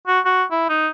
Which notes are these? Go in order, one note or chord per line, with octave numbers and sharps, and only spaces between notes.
F#4
F#4
E4
D#4